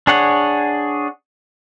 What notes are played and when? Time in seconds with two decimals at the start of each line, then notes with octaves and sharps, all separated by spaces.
0.07 D4 G#4 C#5 F#5